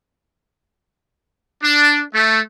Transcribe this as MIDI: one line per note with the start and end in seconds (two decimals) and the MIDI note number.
1.63 2.03 62
2.14 2.40 57